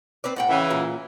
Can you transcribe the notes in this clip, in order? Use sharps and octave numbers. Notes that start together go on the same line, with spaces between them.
C4 B4 D5
A2 F#5 G5
C#3 E3
A#2